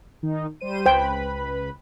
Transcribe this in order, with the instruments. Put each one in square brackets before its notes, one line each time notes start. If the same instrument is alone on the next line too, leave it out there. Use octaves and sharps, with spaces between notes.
[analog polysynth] D#3 D#4
G3 C5 D#7
[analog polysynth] C#2 B4 B5 [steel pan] C5 G5